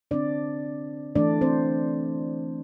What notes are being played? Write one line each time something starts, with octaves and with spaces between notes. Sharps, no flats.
D3 C4 D4 D5
E3 A3 D4 D5
C4 C5